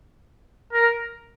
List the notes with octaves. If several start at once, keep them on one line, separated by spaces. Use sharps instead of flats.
A#4